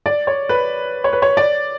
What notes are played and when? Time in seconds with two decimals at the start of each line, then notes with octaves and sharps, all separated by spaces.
0.06 D5
0.27 C#5
0.49 B4
1.04 C#5
1.13 B4
1.22 C#5
1.37 D5